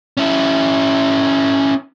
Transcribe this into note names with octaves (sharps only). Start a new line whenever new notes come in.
C#4 E4